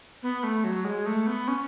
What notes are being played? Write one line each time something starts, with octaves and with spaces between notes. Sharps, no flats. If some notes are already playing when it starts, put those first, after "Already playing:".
B3
A3
F#3
G#3
A3
B3
C#4